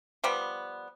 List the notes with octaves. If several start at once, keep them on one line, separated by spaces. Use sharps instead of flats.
F3 G3 B3